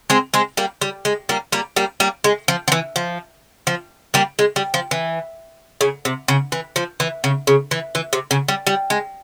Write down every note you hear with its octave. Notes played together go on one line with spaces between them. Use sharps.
G#3 C4
G#3 C4
G3 A#3
G3
G#3
G3 A#3
G3 A#3
G3 A#3
G3 A#3
G#3
F3
F3
E3
F3
F3
G3 A#3
G#3
G3
F3
E3
C#3
C3
C#3
E3
F3
E3
C#3
C#3
E3
E3
C3
C#3
G3
G3
G#3